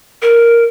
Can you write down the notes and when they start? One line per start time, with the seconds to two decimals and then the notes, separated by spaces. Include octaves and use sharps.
0.22 A#4